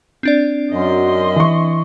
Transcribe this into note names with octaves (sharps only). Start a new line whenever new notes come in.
C4 D4 D5
F#2 D#5 C6
E3 C#6